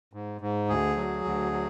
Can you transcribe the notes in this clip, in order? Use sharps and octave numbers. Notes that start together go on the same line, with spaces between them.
G#2
G#2
D2 G#4
F#3
D2
F#3